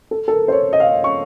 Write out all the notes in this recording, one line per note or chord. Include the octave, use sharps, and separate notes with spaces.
A4
A4
A#4
C5
C#5
D#5
F5
D#5
C#6